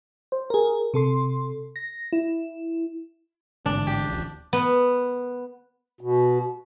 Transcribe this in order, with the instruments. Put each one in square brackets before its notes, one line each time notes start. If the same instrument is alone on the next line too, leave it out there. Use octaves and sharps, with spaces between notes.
[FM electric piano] C5
G#4 A#4
C3 A4 C6
A#6
E4
[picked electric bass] A1 G#2 D3 [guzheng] D4
[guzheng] G4
[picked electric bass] D1 A1
[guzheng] B3
[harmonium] B2